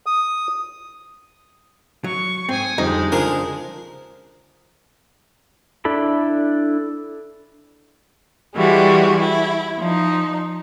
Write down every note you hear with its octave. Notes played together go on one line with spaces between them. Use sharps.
D#6
F#3 C#6
G#2 C4 G#5 D#6
F2 D3 G3 G#3 D#4
C#3 F3 D4 G#4 A#4
D4 E4 A4 B5
E3 G3 G#3 F#4
E4
F3 D#4